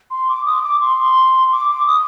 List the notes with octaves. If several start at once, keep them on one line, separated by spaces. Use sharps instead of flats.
C6
D6
D#6
D6
C6
D6
D6
D#6